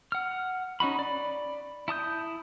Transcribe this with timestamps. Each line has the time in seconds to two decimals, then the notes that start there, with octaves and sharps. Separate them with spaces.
0.12 F#5 F6
0.80 C#4 D#4 F#4 B5
0.99 D5 B5
1.88 E4 A5 D#6 G6